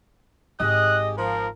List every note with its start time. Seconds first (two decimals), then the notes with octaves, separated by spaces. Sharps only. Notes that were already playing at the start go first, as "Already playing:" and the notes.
0.60 G#1 G4 G#4 D#5 F#6
1.18 F3 A#4